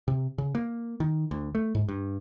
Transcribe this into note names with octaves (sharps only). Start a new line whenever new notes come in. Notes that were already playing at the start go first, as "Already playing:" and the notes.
C3
C#3
A#3
D#3
D2
A3
G#2
G2